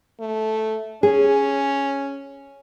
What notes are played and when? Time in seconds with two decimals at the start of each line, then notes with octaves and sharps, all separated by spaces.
0.20 A3
1.03 C#4 G#4